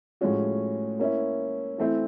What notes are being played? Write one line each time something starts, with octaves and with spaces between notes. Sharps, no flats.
A2 F3 G#3 C#4 F#4
A#3 C#4 E4
E3 A3 C4 E4